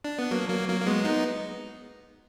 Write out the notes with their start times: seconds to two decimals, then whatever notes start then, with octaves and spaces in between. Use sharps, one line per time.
0.04 D4
0.19 B3
0.31 F#3 A#3
0.49 F#3 A#3
0.69 F#3 A#3
0.81 A#3
0.87 G#3 B3
1.04 B3 D#4